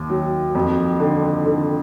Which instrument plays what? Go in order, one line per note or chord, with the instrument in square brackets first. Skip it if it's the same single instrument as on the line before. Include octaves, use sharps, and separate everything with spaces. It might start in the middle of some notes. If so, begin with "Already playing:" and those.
Already playing: [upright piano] D#2
F#3
F2
D3
D3